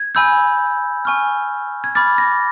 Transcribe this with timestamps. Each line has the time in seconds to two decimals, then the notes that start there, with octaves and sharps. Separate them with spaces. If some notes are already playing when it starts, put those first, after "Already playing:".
Already playing: G#6
0.15 G#5 B5 E6 G6
1.05 G#5 C#6 F6
1.84 G#6
1.95 B5 D6 F6 A6
2.18 A#6